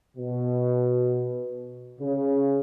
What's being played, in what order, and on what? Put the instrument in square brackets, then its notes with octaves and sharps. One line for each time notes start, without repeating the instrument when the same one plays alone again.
[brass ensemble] B2
C#3